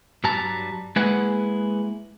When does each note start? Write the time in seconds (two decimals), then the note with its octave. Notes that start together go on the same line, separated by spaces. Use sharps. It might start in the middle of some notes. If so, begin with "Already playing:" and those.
0.24 G2 F#3 G3 A5 A#5
0.96 G#3 A#3 E4 G#4 B4 F#5